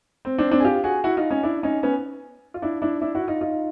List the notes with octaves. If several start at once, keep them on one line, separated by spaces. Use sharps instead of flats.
C4
C4 D4
C4 D4
G#4
F4 G4
F#4 G#4
E4 F#4
D#4 F4
C#4 D#4
D4 E4
C#4 D#4
B3 C#4
F4
D4 E4
D4 E4
D4 E4
E4 F#4
D#4 F4
D#4 F4